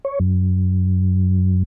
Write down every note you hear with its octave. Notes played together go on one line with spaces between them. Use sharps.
C#5
F#2